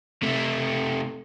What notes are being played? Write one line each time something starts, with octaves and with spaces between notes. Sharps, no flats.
C3 A3